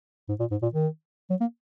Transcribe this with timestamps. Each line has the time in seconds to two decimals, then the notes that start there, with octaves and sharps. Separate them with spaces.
0.29 G#2
0.40 A#2
0.51 G#2
0.62 A#2
0.74 D#3
1.30 F#3
1.41 A#3